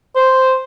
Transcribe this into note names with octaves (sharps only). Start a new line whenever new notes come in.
C5